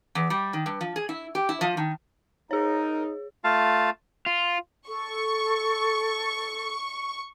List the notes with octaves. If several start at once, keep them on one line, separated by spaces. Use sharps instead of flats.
E2
G3
D#3
G2
F3
G#4
E4
G4
E4
F3
D#3
D#4 G#4 A#4 C#5
A3 F4 F5 A5
F4
A4 C#6